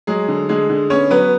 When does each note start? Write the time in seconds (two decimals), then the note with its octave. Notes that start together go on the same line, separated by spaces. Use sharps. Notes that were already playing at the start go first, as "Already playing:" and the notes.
0.07 F#3 G#3 G#4
0.28 D3
0.49 D3 G#3 G#4
0.70 D3
0.90 B3 C#4 C#5
1.11 F#3 B3 B4